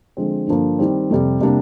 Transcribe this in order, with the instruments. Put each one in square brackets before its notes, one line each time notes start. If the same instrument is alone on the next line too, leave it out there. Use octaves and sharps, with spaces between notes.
[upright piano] D3 F3 G#3 C4
G2 D3 F3 A#3
D#3 G3 C4
F2 C3 G3
C3 G3 A#3 D4